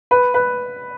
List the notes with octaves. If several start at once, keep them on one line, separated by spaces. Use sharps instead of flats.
B4
B4